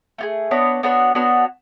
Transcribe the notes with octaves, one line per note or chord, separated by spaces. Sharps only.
A3 F4 G#4
B3 D4 F#4 C#5
B3 D4 F#4 C#5
B3 D4 F#4 C#5